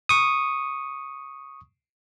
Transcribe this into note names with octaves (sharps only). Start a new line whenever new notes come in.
C#6 D#6